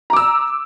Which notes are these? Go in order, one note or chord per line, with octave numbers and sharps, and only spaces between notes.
A#5 D6 E6